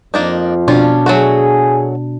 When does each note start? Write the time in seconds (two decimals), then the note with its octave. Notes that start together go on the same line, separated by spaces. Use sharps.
0.14 F2 F3 A#3 D4 D#4
0.68 B2 G3 C#4 D4 F4
1.06 F#3 A3 F#4 G#4